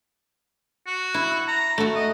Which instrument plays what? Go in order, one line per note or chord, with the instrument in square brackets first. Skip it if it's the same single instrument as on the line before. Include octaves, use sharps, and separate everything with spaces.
[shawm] F#4
[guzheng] E4
[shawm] A#5
[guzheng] A3 F#4
[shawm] D#5